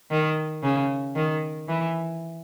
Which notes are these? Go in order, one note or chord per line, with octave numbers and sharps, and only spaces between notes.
D#3
C#3
D#3
E3